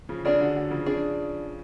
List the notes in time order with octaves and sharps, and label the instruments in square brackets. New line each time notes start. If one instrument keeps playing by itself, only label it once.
[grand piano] C#3 F3
[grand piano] C#3 F3 [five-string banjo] D4 G#4 D5
[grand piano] D3 F#3
D3 F#3
C#3 F3
[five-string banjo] D4 G#4 D5